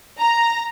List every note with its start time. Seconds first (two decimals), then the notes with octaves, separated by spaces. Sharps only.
0.19 A#5